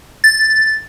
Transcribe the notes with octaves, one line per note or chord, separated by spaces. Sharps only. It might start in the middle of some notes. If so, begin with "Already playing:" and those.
A6